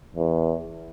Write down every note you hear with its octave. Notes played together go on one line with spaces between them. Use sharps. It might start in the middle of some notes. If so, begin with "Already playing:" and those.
E2